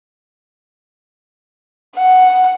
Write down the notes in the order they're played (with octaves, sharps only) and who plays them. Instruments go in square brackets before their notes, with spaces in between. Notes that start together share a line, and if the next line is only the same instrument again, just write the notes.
[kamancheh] F#5